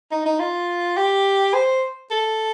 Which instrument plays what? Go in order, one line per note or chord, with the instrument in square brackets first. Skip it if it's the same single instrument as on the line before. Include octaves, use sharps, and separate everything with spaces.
[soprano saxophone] D#4
D#4
F4
G4
C5
A4